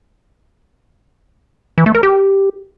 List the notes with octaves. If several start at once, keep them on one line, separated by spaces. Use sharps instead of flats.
E3
A3
A#4
G4